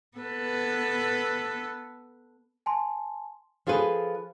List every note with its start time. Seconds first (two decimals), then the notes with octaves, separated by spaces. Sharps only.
0.18 B3 A4 B4
2.66 G#5 A5 C6
3.67 F3 F4 G#4 A4 B4